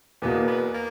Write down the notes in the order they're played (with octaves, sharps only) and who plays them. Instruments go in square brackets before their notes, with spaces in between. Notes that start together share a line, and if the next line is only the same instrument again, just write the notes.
[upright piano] E2 B2 A#3 [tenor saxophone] B3
[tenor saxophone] B3
A#3